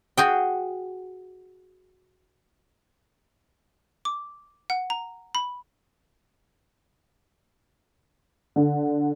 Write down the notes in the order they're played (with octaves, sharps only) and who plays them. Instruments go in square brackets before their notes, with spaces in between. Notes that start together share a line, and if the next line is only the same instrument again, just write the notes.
[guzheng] F#4 G#4 G5
[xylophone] D6
F#5
A#5
B5
[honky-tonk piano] D3